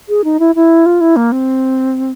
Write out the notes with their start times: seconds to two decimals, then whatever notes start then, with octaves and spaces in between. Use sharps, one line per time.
0.09 G#4
0.24 D#4
0.40 E4
0.55 E4
0.86 F4
1.01 E4
1.16 A#3
1.32 C4